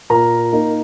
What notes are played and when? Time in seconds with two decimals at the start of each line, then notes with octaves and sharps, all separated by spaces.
0.10 A#2 A#4 A#5
0.52 A#3 D#4